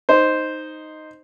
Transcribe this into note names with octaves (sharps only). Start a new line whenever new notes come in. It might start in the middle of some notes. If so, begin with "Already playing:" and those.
D#4 C5